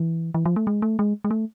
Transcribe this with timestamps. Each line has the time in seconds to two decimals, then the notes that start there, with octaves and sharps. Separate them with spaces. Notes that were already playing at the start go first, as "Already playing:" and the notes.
Already playing: E3
0.34 E3
0.46 F3
0.56 A3
0.67 G#3
0.82 A3
0.99 G#3
1.24 G#3
1.31 A3